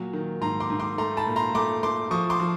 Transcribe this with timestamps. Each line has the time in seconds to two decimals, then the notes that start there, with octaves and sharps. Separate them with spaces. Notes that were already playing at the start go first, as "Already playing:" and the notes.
Already playing: A#2 F#3
0.13 D#3
0.41 G#2 A#5 C6
0.60 C6 D6
0.70 G#2
0.80 C6 D6
0.98 A3 A#5 C6
1.17 A5 B5
1.26 A#2
1.36 A#5 C6
1.55 A3 C6 D6
1.83 A3 C6 D6
2.11 F3 C#6 D#6
2.30 C6 D6
2.40 F3